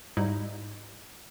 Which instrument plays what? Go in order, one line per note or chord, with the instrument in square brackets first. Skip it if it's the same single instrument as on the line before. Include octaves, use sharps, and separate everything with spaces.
[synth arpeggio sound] G#2 G3 D#4 E4